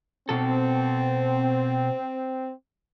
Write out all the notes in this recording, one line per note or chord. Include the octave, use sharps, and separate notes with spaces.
B2 C4 A4